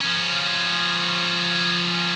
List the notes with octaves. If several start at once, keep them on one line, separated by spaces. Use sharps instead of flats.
F3 C#4